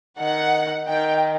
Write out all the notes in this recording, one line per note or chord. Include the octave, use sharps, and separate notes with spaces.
D#3 F#5
D#3 G5